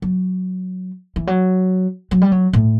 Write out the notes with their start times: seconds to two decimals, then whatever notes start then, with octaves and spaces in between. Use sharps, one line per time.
0.02 F#3
1.16 E3
1.27 F#3
2.11 F#3
2.22 G3
2.32 F#3
2.53 A2